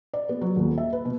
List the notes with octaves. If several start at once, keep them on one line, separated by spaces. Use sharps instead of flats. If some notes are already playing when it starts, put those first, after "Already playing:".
D5
B3
F#3
D#1
E5
B4
B2